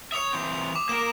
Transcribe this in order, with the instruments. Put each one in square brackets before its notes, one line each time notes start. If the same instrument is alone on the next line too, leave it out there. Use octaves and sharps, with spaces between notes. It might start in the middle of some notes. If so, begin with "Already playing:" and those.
[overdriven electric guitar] C#5 E5 [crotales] D#6 F7
[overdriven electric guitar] E3 C4
[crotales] D6
[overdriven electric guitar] A#3 A#4 [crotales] E7